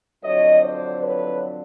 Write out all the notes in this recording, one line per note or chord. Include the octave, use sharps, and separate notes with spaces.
F2 D3 F#3 C#5 D#5
C5 D5
B4 C#5